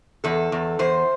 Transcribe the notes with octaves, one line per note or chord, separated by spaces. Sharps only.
E2 A4
E2
E2 C5